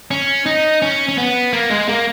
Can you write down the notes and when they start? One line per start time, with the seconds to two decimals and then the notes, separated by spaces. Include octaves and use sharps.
0.11 C#4
0.46 D#4
0.82 C#4
1.09 C#4
1.18 B3
1.53 A#3
1.70 G#3
1.88 A#3